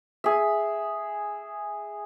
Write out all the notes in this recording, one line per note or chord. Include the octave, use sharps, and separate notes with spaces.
G#4 E5